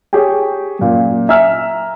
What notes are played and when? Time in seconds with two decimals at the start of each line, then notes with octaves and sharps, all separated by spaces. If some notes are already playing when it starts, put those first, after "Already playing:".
0.13 G4 G#4 C#5 G5
0.79 F#2 A#2
1.29 E5 G#5 A#5 E6 F6